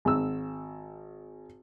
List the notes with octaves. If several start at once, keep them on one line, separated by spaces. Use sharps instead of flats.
G#1 E6